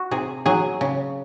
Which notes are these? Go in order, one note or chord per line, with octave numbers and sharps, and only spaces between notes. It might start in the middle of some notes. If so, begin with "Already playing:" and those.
Already playing: F#4
C3 G#4
F#3 G#4
C#3